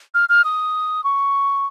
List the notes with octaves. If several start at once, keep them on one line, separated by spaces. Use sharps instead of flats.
F6
F6
D#6
C#6